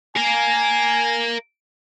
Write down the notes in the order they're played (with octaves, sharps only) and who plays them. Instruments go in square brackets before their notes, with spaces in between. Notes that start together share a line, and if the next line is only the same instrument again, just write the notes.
[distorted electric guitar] A#4 F5 [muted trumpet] G#5